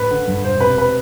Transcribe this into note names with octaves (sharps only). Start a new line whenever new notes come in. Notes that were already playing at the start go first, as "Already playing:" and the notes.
Already playing: A1 B4
D3
G2
E1 C5
C3 B4
B4